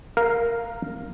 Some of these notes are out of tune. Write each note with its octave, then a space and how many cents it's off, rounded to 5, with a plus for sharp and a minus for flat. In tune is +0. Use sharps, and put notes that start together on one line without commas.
A#4 +0 F5 +0